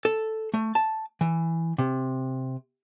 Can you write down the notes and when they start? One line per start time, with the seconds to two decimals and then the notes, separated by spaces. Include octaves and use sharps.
0.05 A4
0.54 A3
0.75 A5
1.21 E3
1.78 C3